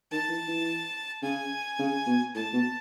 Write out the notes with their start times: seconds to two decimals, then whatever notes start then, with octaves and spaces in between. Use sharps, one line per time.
0.11 D#3 A5
0.29 E3
0.48 E3
1.22 C#3 G#5
1.79 C#3
2.07 B2
2.35 A2 A5
2.53 B2